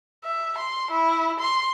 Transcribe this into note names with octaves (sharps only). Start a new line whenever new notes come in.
E5
C6
E4
C6